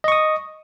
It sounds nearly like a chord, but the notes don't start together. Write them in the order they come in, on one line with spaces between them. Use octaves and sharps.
D#5 C#6 D#6